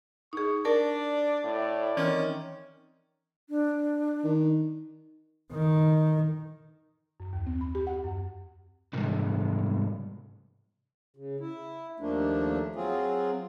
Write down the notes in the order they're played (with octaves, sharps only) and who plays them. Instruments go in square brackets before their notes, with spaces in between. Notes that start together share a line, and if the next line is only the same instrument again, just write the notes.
[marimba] D#4 G#4 [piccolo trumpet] C#6
[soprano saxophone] D4 [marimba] A#4 [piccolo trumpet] D5
[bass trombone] A2 [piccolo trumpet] D5
[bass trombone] D#3 [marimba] E3 C4 F6 [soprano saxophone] C#4
[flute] D4
[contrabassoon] D#3
[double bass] D#3
[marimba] F#2
D#2
C4
B5
G4
F#5
F#2
[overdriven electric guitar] C2 G#2
[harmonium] C#3
E4
D#2 F3 A3 A#3 D4
F#3 C4 F4 G#4